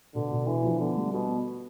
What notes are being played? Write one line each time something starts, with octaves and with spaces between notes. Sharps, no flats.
B2 D3
B2
E3 D4
F3
D3 B3
G3
B2 B3
B3